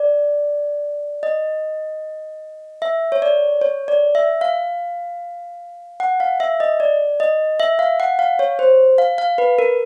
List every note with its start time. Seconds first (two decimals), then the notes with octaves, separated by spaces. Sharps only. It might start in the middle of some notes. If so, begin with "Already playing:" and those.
Already playing: D5
1.23 D#5
2.82 E5
3.12 C#5
3.22 D5
3.61 C#5
3.88 D5
4.15 E5
4.41 F5
6.00 F#5
6.20 F5
6.40 E5
6.60 D#5
6.80 D5
7.20 D#5
7.60 E5
7.79 F5
8.00 F#5
8.19 F5
8.39 C#5
8.59 C5
8.98 F5
9.18 F5
9.38 B4
9.59 A#4